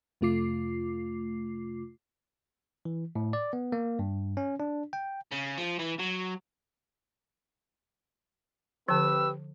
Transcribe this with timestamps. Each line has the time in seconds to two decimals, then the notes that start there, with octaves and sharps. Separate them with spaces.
0.21 F2 C3 A3 F4 D6 C7
2.85 E3
3.16 A2
3.33 D5
3.53 B3
3.72 A#3
3.99 G2
4.37 C#4
4.60 D4
4.93 G5
5.32 C#3
5.58 F3
5.79 E3
6.00 F#3
8.88 D3 F3 C4 G4 B4 E6